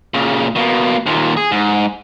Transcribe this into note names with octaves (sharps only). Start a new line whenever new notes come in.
A#2 C#3
B2 A#3
D#2 A#2
G#4
G#2